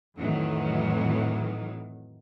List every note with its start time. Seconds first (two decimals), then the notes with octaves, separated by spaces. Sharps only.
0.18 F2 A2 D#3 E3 F#3